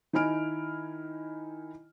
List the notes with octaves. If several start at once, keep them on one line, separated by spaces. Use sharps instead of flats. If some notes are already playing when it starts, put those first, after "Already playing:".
D#3 D#4 E4 G#5 F6 D7